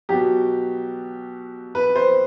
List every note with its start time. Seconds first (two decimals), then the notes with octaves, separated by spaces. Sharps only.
0.09 B2 F#3 G4
1.75 B4
1.96 C5